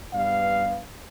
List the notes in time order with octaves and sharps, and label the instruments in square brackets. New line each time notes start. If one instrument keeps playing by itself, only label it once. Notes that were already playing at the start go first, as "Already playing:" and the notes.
[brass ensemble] G2 B3 F5